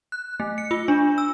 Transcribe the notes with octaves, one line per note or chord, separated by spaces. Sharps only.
F#6
A3
C#7
F4
D4
E6